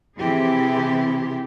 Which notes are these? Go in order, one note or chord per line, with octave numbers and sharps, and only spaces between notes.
C3 E3 C4 E4 G4 G#4